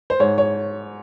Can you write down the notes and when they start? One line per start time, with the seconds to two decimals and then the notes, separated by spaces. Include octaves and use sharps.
0.10 C5
0.20 G#2 C#5
0.38 C#5